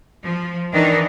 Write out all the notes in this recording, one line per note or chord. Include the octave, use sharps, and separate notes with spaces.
F3
D#3 E3 D4 D#4